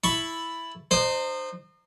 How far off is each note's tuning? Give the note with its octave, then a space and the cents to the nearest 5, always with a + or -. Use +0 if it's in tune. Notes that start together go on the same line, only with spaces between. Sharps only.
E4 +0 A5 +0 C#6 +0
D#4 -35 C5 +0